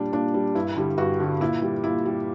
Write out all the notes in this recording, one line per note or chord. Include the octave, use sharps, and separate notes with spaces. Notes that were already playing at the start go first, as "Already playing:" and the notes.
Already playing: A#2 G3 D4
A#2 D4
G3
G2 E4
D3 G3
G2 F#4
D3 G3
A#2 E4
G3
A#2 E4
G3